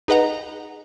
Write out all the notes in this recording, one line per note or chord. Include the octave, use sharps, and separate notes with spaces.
D#4 G#4 B4 D#5 F#5 A#5